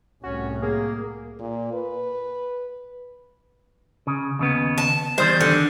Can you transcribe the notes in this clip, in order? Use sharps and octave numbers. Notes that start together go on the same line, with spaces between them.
C2 A2 C#4 F#4
A#3 G#4
A#2
B4
C#3
D#2 C#3 B3
A5
E2 D#3 G3 C5
D3